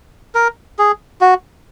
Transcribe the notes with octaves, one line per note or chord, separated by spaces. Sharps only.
A#4
G#4
F#4